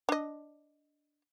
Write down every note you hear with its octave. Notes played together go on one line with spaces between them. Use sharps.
D4 D#5